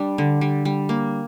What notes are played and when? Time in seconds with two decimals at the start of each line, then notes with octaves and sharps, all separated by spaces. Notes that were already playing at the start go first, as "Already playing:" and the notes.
Already playing: G3 D4
0.18 D3
0.41 G3
0.65 G3
0.89 A#3